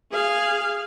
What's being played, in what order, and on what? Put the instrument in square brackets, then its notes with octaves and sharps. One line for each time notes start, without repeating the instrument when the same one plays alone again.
[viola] G#4 F5